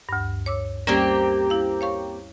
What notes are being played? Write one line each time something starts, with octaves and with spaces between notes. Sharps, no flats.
D2 G2
C#5 D6 E6
G3 A#3 C4 C#4 G4 D5
E4 F5
C#5 F5 C#6